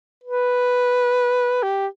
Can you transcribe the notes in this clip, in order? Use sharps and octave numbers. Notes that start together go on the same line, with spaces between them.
B4
G4